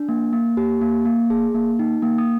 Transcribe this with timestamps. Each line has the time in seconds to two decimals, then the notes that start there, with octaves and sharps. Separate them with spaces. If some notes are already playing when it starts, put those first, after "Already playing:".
Already playing: D4
0.09 A#3
0.33 A#3
0.57 G4
0.81 A#3
1.05 A#3
1.30 G#4
1.54 A#3
1.79 D#4
2.02 A#3
2.18 D#6